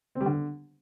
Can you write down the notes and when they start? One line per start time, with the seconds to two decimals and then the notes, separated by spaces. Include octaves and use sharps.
0.15 C4
0.21 G3
0.26 D3